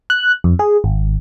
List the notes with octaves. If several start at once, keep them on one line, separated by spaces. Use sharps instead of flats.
F#6
F2
G#4
G#1